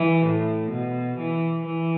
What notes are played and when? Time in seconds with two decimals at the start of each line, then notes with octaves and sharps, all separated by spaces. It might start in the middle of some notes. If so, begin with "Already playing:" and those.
Already playing: E3
0.26 A2
0.72 B2
1.18 E3
1.66 E3